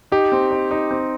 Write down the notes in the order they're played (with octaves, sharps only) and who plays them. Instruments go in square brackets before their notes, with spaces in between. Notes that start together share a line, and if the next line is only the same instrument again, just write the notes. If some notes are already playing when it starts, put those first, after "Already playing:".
[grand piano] D#4 [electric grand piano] G4
[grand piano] C4
D#4
D#4
C4